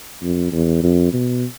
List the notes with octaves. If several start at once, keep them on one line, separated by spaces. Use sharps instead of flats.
F2
E2
F2
B2